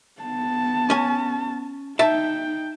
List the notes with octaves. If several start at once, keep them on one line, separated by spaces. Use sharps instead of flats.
B3 A5
C#4 G#5
D#4 E5 G5 A5